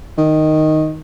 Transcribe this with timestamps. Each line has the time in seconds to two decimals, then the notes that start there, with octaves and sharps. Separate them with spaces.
0.18 D#3